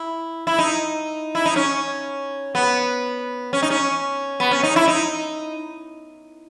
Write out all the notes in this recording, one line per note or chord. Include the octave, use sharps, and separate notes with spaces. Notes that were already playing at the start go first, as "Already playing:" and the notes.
Already playing: E4
E4
D#4
E4
D#4
C#4
B3
C#4
D#4
C#4
B3
C#4
D#4
E4
D#4